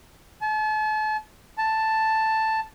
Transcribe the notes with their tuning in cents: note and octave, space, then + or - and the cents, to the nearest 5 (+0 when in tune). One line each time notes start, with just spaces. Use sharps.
A5 -40
A5 +5